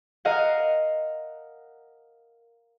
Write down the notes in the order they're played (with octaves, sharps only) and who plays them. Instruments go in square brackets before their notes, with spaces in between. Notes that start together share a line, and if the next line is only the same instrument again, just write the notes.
[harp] A#4 D#5 F5 F#5